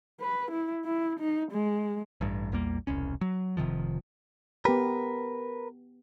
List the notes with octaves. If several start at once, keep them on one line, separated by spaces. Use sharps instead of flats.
B4
E4
E4
D#4
G#3
A1 G2
A#1 E2 G3 A#3
E1 C2 C#4
F#3
F1 C3 D#3 F3
B3 G4 A#4 B4